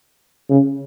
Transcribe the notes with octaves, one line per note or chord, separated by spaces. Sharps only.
C#3